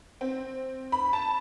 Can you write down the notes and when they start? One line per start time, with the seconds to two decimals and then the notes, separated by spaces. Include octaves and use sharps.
0.21 C4
0.92 B5
1.13 A5